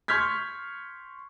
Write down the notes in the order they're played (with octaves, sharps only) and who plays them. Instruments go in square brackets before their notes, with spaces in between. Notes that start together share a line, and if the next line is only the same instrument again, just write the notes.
[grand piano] C6 C#6 F6 G6 G#6 B6